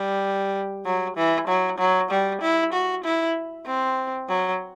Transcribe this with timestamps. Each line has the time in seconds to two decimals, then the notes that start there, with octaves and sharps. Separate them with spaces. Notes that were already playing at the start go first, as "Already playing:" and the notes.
Already playing: G3
0.85 F#3
1.16 E3
1.47 F#3
1.78 F#3
2.10 G3
2.41 E4
2.73 F#4
3.04 E4
3.66 C4
4.29 F#3